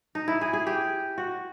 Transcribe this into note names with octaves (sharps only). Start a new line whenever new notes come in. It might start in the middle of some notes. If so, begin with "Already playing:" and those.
D#4
E4
G#4
G#4
G4
F#4